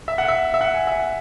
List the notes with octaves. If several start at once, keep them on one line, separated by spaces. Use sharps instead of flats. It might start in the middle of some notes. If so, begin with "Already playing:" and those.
E5
F#5
E5
E5
F#5
G#5
E5
F#5